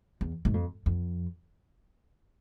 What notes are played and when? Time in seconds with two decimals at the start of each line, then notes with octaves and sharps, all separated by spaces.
0.21 E2
0.45 G#2
0.54 F2
0.86 F2